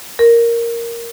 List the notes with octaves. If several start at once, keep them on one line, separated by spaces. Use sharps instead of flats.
A#4